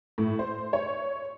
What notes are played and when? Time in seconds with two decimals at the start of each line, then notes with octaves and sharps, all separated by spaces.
0.18 A2
0.39 C5
0.73 C#5